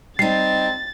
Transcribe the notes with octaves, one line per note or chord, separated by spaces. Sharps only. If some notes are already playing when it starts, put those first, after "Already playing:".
G3 C4 D#4 A6 C7